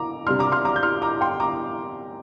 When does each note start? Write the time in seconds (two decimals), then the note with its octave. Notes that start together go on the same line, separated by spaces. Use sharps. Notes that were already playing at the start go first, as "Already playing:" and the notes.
Already playing: A#5 D6
0.27 C3 G3 D4 C6 F6
0.39 A#5 D6
0.52 C6 F6
0.65 A#5 D6
0.76 G6
0.83 C6 F6
1.02 A#5 D6
1.21 G5 C6
1.40 A#5 D6